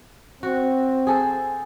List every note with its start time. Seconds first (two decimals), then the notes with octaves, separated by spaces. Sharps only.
0.43 C4 F#4
1.07 G#4 A4 C5